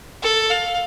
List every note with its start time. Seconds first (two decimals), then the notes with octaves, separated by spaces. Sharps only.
0.23 A4
0.50 F5